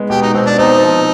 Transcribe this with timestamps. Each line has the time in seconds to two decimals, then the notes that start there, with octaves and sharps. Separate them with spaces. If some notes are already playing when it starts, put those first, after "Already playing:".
Already playing: G#3 B3
0.10 B2 G4
0.22 D#4
0.34 B2 C4
0.46 D4
0.58 C4 D#4
0.83 F3